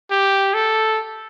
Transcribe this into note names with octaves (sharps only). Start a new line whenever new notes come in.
G4
A4